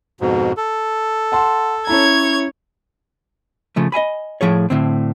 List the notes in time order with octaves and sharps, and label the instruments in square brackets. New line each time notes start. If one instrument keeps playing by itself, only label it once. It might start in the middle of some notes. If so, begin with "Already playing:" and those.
[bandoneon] F2 G#2 B2
A4
[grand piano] F#5 A5 C6
[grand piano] C#4 E4 A#5 [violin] C#5 G#6
[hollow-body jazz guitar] C#3 F3 A3
D#5 E5 G#5 B5
A2 F3 G#4 C#5
A2 D3 C4